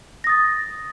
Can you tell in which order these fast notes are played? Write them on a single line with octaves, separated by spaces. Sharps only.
A#6 D#6 A6